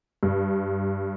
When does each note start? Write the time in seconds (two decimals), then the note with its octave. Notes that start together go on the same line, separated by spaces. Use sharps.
0.23 G2